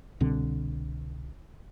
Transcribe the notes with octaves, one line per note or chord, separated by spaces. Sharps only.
C2 B2 D3 C4